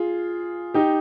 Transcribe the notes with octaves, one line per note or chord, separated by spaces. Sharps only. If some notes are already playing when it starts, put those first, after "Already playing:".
Already playing: F4 G#4
D#4 G4